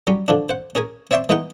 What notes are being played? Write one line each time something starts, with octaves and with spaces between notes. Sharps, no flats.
F#3 G3 C#4
D3 F3 D4
C5 F#5
C#4 G#4 A#4 G#5
C4 C#5 D5 E5 G5 C6
E3 G#3 B3 D#4 F#5 G5